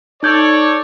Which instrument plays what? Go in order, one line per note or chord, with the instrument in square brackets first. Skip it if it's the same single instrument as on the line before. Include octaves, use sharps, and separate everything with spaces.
[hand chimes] D#4 G6 G#6 [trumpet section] A4 C#5 D5